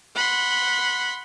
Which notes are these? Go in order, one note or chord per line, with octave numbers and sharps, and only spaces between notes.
F#5 B5 C6